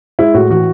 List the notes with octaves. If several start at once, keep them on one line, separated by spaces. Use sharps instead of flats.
G#3 E4
A2 F#4
E3 F#4